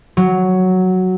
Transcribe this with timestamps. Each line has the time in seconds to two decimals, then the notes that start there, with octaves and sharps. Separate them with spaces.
0.17 F#3